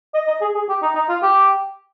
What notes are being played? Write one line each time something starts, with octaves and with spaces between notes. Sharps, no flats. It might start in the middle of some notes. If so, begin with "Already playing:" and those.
D#5
D#5
G#4
G#4
G4
D#4
D#4
F4
G4